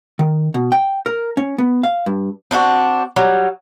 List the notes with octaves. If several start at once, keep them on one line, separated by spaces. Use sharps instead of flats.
D#3
B2
G5
A#4
C#4
B3
F5
G2
C4 D4 D#4 F#4
F#3 G3